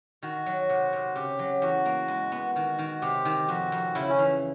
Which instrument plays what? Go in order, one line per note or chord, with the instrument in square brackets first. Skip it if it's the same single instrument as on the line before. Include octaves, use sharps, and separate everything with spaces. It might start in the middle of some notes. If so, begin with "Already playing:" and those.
[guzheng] D#3 [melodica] F#4
[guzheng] F#3
C3
C3
[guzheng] C#3 [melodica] G4
[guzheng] F#3
[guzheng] E2 [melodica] F#4
[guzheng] A#3
G#3
B3
[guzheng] D#3 [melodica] F#4
[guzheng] D#3
[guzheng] C3 [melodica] G4
[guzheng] D#3
[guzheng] F2 [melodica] F#4
[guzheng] F2
[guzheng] C#3 [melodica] E4
[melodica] C#4
[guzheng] E3